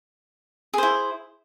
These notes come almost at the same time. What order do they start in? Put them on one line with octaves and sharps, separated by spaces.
G#4 C5 E4